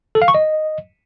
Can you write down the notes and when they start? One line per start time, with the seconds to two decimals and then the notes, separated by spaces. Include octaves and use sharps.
0.15 A4
0.22 F5
0.28 C#6
0.34 D#5